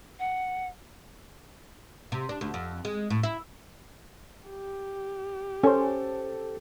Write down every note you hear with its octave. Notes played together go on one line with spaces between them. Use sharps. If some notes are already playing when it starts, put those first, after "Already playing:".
F#5
C3
D4
D2
F2
G#3
A2
E4
G4
C#4 A4 C5 G#5